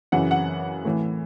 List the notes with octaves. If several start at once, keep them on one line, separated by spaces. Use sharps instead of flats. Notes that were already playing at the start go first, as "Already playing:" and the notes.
F#2 C#3 E3 F#5
F#5
A2 E3